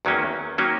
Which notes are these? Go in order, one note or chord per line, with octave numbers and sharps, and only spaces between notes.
E2 D#3 F#3 A#3 C#4
D#3 F#3 A#3 C#4